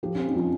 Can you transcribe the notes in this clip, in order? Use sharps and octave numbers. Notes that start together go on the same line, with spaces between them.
F3 F4 G4
C#4
C4
D#4
F3 C#4